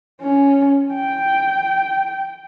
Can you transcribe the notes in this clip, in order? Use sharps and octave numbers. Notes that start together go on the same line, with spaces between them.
C#4
G5